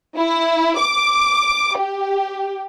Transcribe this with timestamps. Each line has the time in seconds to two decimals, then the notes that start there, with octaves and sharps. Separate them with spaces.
0.16 E4
0.78 D6
1.77 G4